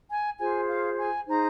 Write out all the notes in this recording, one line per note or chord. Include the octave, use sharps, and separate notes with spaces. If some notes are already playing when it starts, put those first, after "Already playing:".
G#5
F4 G#4 C5 G#5
F5
G#5
D#4 G#4 C5 A#5